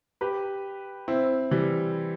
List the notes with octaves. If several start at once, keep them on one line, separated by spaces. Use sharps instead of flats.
G4 B4
C4 E4
E3 G3